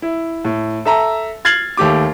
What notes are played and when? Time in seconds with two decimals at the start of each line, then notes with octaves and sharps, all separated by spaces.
0.02 E4
0.45 A2
0.85 A4 E5 A#5
1.45 F6 G#6 A6 C7 F7 F#7
1.77 D#2 A3 G4 D6